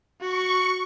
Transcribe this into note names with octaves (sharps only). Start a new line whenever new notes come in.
F#4 C#6